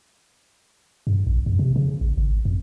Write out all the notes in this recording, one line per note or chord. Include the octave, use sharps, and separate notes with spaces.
G2
A#1
F#2
C3
C#3
A1
G#1
F2